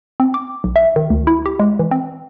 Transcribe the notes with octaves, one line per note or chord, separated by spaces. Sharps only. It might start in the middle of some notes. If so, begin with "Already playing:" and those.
C4
D6
B1
E5
D#3
D2
E4
G4
G#3
E3
C4